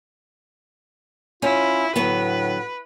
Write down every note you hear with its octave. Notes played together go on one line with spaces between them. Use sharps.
C#4 E4 F4
A2 D3 F#3 B3 B4